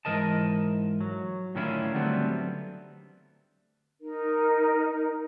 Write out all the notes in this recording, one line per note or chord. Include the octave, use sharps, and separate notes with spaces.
G#2 E3 A#4 D#5 A5
F#3
A2 D3 D#3 C#4 E4 F4
D3 F#3 G3 A3 B3 C4
D#4 A#4